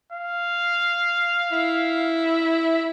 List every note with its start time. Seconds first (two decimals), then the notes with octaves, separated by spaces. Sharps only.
0.12 F5
1.52 E4